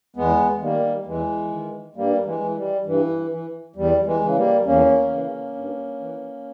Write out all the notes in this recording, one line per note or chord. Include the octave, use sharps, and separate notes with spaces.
E2 G#3 B3
D#3 G3 A#3
E2 E3 G#3
D#3
G2 G3 A#3
E3 G#3
E3
G3
G2 E3
E3
E2 G3
E3 G#3
C#3 E3
G3 A#3
E2 A#3 C#4
C#3 E3
G2
E3